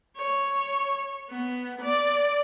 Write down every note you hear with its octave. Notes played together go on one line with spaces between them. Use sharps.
C#5
B3
D5